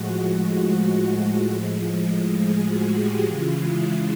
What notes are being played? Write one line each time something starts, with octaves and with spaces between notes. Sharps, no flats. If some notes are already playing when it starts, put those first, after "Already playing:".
Already playing: A2 F3 G#3 F#4
F#4
A2 F3 G#3
G#4
F#4
G4
C#3 E3 G#3 F4
E4